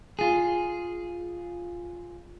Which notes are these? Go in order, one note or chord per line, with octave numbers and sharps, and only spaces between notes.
F4 G#4